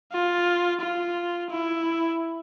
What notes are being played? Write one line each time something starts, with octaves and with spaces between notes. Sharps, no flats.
F4
F4
E4